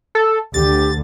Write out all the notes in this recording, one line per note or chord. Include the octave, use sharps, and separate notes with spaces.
A4
D2 D3 G4 A6